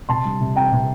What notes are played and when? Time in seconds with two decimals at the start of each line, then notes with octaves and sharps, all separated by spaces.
0.09 C3 A5 C6
0.25 G3
0.41 C3
0.56 C4 G5 A#5
0.72 C3